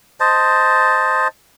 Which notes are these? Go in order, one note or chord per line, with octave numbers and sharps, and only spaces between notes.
C5 D#5 A5